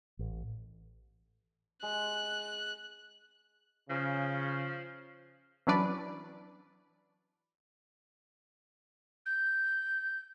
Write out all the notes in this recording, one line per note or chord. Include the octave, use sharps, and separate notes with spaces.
A1
G#3 F#6
C#3 F3
E3 F#3 C#4 D4 B4 D5
G6